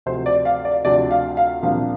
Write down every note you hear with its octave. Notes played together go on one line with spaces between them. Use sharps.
D2 C3 F3 C4 C5
D5
F5
D5
D2 C3 F3 D4 D5
F5
F5
C2 A#2 F3 A#3 D4 F5